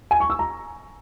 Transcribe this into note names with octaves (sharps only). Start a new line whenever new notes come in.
G#5
C#6
E6
A#5